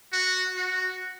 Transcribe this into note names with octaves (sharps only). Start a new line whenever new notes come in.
F#4
F#4